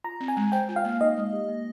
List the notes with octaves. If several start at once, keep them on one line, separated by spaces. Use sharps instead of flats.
F4 A#5
C4
G#5
G#3
C5 G5
F4
F5
A#3
D#4 D#5
G#3
G4
A#3